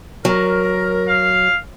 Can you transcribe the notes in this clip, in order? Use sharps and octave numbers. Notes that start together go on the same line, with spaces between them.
F#3 A#4
F5